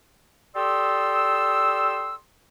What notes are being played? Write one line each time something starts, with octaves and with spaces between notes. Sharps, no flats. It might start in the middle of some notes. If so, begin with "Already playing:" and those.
G4 A4 D5 C6 D#6 E6